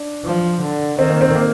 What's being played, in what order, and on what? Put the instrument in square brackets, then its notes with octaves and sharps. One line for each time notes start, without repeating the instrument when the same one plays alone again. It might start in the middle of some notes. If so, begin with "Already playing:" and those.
Already playing: [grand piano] D4
[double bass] F3
D3
[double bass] D#3 [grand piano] C4
[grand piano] A#3
C4
A#3